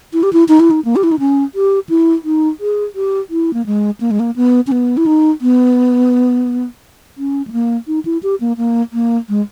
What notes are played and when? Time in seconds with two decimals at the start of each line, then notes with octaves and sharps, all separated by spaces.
0.13 E4
0.23 G4
0.33 E4
0.48 D#4
0.60 E4
0.71 D#4
0.85 A#3
0.96 G4
1.03 E4
1.12 D#4
1.19 C#4
1.55 G4
1.89 E4
2.24 D#4
2.60 G#4
2.95 G4
3.30 E4
3.54 A#3
3.66 G#3
4.00 A#3
4.11 G#3
4.20 A#3
4.36 B3
4.67 C#4
4.72 B3
4.97 E4
5.06 D#4
5.41 B3
7.18 C#4
7.48 G#3
7.52 A#3
7.87 D#4
8.05 E4
8.23 G4
8.41 A#3
8.57 A#3
8.93 A#3
9.29 G#3